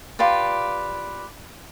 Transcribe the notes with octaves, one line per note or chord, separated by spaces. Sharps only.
F4 G4 B4 D5